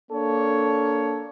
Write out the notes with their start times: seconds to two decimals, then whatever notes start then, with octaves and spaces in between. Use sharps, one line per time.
0.11 A#3 D4 A4 C#5